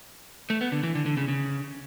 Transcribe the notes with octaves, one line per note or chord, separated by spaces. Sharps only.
A3
B3
D3
E3
D3
D3
C#3
C#3